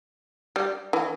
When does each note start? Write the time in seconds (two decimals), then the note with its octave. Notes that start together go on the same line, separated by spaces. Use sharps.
0.56 G3
0.93 E3